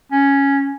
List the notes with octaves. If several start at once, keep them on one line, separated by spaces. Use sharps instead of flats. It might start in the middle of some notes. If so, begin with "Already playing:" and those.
C#4